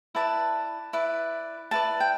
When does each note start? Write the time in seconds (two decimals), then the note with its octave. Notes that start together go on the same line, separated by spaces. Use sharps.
0.15 E4 B4 D5 A5
0.93 E4 B4 D5
1.71 E4 B4 D5 A5
2.00 G5